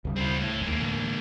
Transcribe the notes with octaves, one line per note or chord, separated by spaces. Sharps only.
D2 C#3 G3
C4 E4
A2
D#2 G#3 A#3
A2 D3 E3